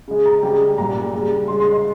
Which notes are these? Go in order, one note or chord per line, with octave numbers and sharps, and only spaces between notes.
C#3 G#3
A#5
C#3 G3 G5
A#2 G3 A#5
C#3 G3
C#3 G#3 C6
C6
D#5